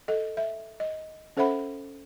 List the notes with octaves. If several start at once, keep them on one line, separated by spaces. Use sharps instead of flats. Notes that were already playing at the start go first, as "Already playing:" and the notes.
A4 D#5
E5
D#5
C#4 A4 C5 E5 F#5 B5